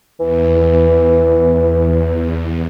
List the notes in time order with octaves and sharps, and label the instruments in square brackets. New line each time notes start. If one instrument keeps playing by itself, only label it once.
[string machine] E2 [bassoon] E3